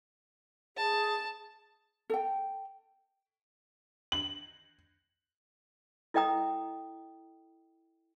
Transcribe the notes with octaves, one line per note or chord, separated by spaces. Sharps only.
G#4 A5
A4 G5
F#7
E4 A4 D#5 G5 A#5 D#6